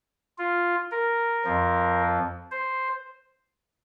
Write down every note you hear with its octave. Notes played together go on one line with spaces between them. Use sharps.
F4
A#4
F2 F3
C5